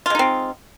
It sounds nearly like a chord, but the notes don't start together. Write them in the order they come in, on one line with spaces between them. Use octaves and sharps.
F4 G#3 D#4 C4